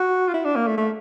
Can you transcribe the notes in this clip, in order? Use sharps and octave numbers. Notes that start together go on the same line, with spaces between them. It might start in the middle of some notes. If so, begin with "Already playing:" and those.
Already playing: F#4
F4
E4
D4
A#3
A3
A3